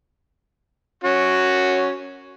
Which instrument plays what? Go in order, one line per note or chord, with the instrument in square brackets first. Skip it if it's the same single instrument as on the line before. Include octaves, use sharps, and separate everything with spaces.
[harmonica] C#4 F#4